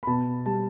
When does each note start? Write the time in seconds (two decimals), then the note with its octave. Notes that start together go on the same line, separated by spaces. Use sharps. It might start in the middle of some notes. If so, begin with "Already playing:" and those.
0.03 B5
0.07 B2 A5
0.46 G3 A5